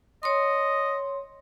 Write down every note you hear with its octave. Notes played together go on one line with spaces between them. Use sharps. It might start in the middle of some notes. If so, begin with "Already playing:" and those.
C#5 D#5 C6